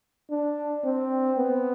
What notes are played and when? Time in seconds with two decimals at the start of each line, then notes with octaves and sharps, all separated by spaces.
0.30 D4
0.84 C4
1.37 B3